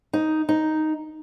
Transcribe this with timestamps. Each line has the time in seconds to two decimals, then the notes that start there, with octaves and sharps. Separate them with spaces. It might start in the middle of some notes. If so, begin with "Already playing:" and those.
0.13 D#4
0.49 D#4